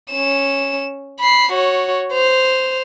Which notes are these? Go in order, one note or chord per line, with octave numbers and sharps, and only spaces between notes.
C#4 E7
B5 C7
F#4 C#5
C5 F7